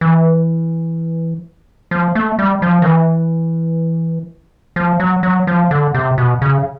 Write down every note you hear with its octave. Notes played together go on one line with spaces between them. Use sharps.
E3
F3
A3
G3
F3
D#3
E3
F3
F#3
F#3
F3
D3
C3
B2
C#3